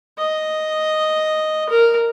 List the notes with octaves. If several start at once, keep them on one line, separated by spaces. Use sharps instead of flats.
D#5
A#4